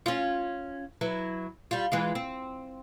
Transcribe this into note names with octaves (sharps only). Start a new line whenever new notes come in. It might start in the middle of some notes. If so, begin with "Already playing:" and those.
C#4 F4
F#3 E4 B4
G3 F4
E3 G#3 F4
C4